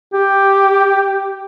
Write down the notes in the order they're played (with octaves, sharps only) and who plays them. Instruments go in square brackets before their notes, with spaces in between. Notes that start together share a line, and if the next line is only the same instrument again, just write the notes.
[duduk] G4